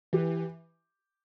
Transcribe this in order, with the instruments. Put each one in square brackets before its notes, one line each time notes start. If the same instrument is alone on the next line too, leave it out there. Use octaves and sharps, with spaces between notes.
[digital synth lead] E3 [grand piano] G4